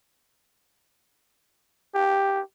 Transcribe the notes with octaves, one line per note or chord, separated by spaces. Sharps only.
G4